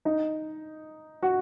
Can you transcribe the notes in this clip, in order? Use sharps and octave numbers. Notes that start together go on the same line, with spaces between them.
D#4
F#4